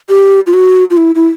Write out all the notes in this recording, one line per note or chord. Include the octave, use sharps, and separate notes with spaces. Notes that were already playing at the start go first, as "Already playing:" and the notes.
G4
F4
F#4
F4
E4
E4